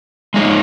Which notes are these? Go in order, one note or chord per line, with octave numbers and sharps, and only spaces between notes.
G#3 D#4 G#4 C#5